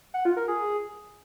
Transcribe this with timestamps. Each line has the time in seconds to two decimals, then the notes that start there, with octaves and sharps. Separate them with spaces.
0.14 F#5
0.25 F4
0.37 A#4
0.48 G#4